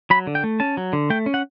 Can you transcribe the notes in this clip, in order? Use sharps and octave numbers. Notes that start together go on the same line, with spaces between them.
F#3 B5
D3
G5
A3
C#4 A5
F#3
D3
A3 G5
C#4
F#5